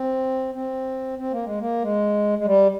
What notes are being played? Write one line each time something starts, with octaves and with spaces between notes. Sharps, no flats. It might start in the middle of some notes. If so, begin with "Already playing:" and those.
Already playing: C4
C4
C4
A#3
G#3
A#3
G#3
G#3
G3